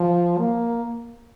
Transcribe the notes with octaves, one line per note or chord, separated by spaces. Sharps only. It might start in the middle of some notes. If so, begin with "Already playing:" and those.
Already playing: F3
A#3